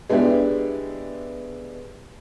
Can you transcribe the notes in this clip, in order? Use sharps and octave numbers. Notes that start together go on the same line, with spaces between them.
G#3 B3 D4 E4 G4